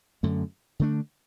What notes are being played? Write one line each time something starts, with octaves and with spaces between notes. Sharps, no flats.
F#2 D3 A3
D3 A3 D4